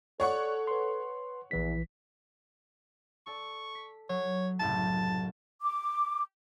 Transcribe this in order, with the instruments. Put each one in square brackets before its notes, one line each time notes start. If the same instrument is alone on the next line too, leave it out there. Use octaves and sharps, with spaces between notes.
[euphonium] A4 [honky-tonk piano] C#5 F#5 C#6 [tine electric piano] D5
[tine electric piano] B4 C6
[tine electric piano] A#1 E3 B6 [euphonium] E2
[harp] A4 D5 A5 [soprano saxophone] C#6
[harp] B6
[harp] F#3 [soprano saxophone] C#5
[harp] F#1 C2 A2 [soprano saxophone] A5
[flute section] D6